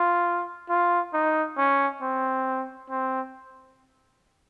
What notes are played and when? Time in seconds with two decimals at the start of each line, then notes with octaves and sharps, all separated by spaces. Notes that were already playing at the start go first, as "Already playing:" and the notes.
Already playing: F4
0.70 F4
1.13 D#4
1.58 C#4
2.02 C4
2.90 C4